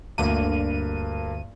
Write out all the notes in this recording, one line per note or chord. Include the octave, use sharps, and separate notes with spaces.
D2 G2 A#3 D#7